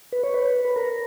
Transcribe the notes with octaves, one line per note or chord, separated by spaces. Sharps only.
B4
C#5
B4
B4
A#4